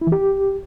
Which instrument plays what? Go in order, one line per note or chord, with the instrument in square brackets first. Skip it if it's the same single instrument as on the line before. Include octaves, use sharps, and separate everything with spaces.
[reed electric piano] E4
E3
G4